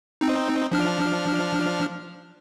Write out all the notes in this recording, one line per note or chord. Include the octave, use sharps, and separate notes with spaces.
C4 D#4
F3 D4 F6